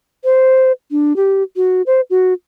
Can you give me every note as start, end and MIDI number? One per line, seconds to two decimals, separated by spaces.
0.25 0.72 72
0.91 1.16 62
1.16 1.43 67
1.56 1.82 66
1.86 2.01 72
2.10 2.33 66